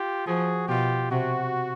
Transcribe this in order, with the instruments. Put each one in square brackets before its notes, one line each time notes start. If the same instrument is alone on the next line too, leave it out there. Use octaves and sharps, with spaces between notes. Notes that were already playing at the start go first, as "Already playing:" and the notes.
Already playing: [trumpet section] F4 G4
[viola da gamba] F3 [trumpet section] F#4 G#4
[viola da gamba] B2 [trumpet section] F4 G4
[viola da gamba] C3 [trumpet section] F#4